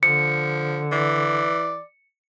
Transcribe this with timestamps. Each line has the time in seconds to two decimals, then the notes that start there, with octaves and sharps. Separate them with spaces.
0.03 D3 F3 C#7
0.92 E3 D5